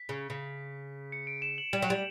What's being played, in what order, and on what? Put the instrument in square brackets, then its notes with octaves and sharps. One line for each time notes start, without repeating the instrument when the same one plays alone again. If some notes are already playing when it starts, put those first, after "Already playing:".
Already playing: [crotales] B6
[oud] C#3
C#3
[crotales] C#7
D7
E7
F#7
[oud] G3 [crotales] F#7
[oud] F#3
[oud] G3 [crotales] F7